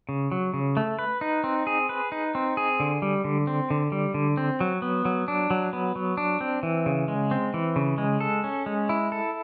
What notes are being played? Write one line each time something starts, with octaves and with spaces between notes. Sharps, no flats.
C#3
F#3
C#3
A3
B4
D#4
C4
G#4
B4
D#4
C4
G#4
D3
G3
D3
C4
D3
G3
D3
C4
F#3
B3
F#3
D4
F#3
B3
F#3
D4
C4
E3
C#3
G#3
C4
E3
C#3
G#3
A4
C#4
G#3
E4
A4